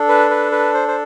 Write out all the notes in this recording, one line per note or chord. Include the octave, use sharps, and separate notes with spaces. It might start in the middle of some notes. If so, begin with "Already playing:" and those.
Already playing: D4 A4
B4
B4
B4
C5
C5